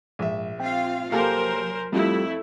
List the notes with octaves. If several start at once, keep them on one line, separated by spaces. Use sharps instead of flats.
A#1 G#2 E5
C4 F4 F5 G5
C2 F#3 A#3 G4 A4 A#4 C5 G#5
F2 G3 A3 E4 F4 G4